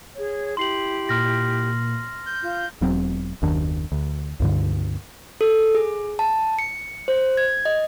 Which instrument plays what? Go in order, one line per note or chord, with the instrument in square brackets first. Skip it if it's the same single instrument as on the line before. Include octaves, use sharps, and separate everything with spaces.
[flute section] G#4 C#5
[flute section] E4 G4 [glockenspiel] C6 C7 F#7
[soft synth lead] A#2 [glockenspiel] C6 F6 A#6
[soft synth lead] G6
[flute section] F4 F5
[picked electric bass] E1 F#3 C4
F#1 D#2 D#3 D4
D2
C#2 G2 D3
[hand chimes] A4
G#4
A5
C#7
C5
G#6
D#5